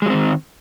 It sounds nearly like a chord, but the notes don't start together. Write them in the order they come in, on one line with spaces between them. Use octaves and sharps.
G#3 F#3 C4 D#3